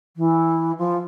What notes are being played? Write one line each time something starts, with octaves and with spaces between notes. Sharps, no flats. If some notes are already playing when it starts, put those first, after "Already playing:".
E3
F3